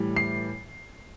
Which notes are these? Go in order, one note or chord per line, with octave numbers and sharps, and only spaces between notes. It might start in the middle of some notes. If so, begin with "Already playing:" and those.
Already playing: A2 E3 G3
C7